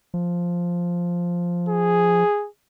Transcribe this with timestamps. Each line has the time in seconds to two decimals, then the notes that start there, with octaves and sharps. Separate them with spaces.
0.14 F3
1.69 G#4